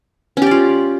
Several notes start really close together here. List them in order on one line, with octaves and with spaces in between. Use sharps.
C#4 G4 D5 F4